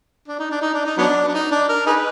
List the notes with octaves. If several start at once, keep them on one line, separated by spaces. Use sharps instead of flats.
D4
D#4
D4
D#4
D4
D#4
F#3 B3 D4
D4
D#4
D4
A#4
D#4 G#4 B4